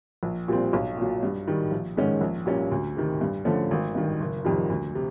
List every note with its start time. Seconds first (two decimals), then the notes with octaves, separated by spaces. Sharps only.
0.23 A#1
0.48 A#2 G3 C4
0.73 B1
0.97 A#2 F#3
1.23 G2
1.48 D#3 G3
1.71 A#1
1.97 G#2 D#3 G#3 C#4
2.21 A#1
2.46 A#2 G3 A#3 C#4
2.71 D2
2.97 C3 D#3
3.21 G2
3.45 D3 F3 A3 C#4
3.71 G#1
3.95 G2 D#3
4.20 F#1
4.45 F2 C3 D#3 G3
4.70 D2
4.95 C3